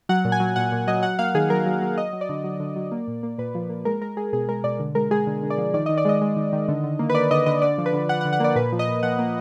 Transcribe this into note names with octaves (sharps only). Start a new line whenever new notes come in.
F#3 F#5
A#2
G#5
F#3
A#2 F#5
A#2
F#3 D#5
F#3 F#5
A#3 F5
D#3 G#4
F#3 A#4
F#3
F#3
F#3 D#5
F#3
D5
D3
F#3
D3
F#3
A#3
A#2
A#3
A#2 B4
F3
A#3
G#3 A#4
G#3 A#4
G#3 G#4
B2 G#4
G#3 A#4
B2 D5
D3
G#3 A#4
G#3 G#4
D3
D3
D5
F3
D#3 D5
D#3 D#5
D5
G#3 D#5
G#3
D#3
D#3
D3
D3
A#3
B4
A#3 D5
D3 D#5
D3 D#5
D3 D5
F3
B4
D3
D3 F#5
F#5
D3
F#5
A#3 D5
A#2 B4
F3
D#5
A#2
F3 F#5
A#3